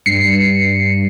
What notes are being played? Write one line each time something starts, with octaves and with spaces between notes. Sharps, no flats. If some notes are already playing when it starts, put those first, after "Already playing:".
G2 C7 C#7